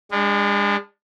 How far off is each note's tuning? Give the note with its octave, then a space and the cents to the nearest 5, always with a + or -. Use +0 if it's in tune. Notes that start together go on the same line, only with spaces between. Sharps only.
G#3 -35 D4 +0